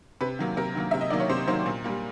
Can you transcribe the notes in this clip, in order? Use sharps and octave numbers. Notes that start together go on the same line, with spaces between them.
C3 B4
D#3 F#3 A#3
C3 A#4
D#3 F#3 A#3
C3 E5
D#5
D#3 F#3 A#3 D5
C#5
C3 C5
D#3 F#3 A#3 C5
A#2
G3 A#3